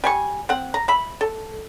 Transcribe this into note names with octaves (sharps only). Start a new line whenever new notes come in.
G3 G#5 C#6
C4 F#5
A#5
E5 B5
A4